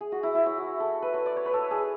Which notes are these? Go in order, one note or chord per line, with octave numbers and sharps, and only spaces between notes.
G#4
F#4
E4
E4
C#5
F#4
A4
B4
C#5
D5
C#5
B4
A4
G#4